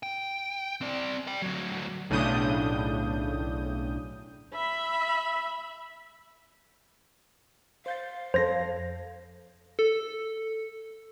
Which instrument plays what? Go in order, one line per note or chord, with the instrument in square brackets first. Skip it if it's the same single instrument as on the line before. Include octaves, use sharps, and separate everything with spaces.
[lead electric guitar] G5
C4 D5
D5 G5
D2 F#3
[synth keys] B1 A2 C#3 D4 D#6 G6
[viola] E5 B5
[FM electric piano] C5 G6 A6 [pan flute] F5
[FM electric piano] F2 A4 [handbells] C5 G#6 A#6
[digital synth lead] A4